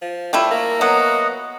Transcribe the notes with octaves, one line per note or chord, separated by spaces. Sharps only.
F3
G3 A3 E4 F4
A#3
F#3 B3 D#5 F#5